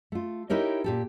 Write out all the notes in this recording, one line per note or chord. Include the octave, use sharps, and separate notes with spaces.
A3 F4
D#4 E4 G4 A#4 C#5
A#2 G4 A4